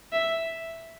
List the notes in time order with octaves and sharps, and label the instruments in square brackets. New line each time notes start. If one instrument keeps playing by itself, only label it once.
[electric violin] E5